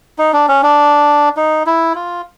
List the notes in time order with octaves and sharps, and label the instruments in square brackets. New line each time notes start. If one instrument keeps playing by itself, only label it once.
[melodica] D#4
D4
C#4
D4
D#4
E4
F4